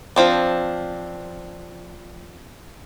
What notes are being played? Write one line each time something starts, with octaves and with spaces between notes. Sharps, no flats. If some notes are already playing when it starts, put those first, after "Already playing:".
F3 C4 D4